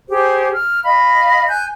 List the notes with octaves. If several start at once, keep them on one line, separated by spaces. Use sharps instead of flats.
G4 G#4 C5
F6
D#5 F5 B5
G#5 F#6 G6